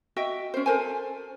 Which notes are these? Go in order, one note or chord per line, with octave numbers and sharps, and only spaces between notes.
F#4 D#5 E5 G5
C#4 C5
A4 A#4 C5 G#5